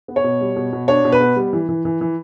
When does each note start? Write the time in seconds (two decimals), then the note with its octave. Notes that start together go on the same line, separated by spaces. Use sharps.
0.08 B3
0.16 C#5
0.24 B2
0.41 G3
0.56 B2
0.73 B2
0.88 D4 C#5
1.04 B2
1.12 B4
1.20 B3
1.36 G3
1.53 E3
1.69 E3
1.85 E3
2.01 E3